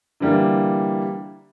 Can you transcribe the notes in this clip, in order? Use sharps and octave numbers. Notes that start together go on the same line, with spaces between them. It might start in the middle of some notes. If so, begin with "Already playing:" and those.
D3 E3 G3 A#3